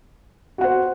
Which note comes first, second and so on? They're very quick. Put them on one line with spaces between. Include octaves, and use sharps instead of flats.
F#4 F#5 C5